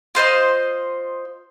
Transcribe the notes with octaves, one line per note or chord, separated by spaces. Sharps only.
F4 C5 D#5 C6